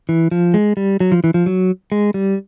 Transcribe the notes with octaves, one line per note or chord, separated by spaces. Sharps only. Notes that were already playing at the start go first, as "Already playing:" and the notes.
E3
F3
G#3
G3
F#3
F3
E3
F3
F#3
G#3
G3